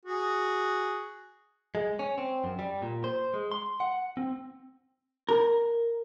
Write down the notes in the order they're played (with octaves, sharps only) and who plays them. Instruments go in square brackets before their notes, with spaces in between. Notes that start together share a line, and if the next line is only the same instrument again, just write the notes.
[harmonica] F#4 G#4
[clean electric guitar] G#3
C#4
C4
F#2
G3
A#2
C5
G#3
C6
F#5
C4
[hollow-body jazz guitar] A#4